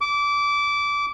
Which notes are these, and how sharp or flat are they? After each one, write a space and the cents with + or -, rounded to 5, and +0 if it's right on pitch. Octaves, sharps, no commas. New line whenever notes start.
D6 -20